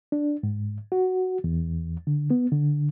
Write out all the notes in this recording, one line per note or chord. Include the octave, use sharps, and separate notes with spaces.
D4
G#2
F#4
E2
D3
B3
D3